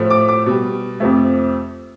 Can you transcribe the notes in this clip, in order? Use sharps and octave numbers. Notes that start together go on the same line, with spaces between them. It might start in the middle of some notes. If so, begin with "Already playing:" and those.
Already playing: A2 F3 A3
D6
D6
B2 G3
F2 C3 F3 A3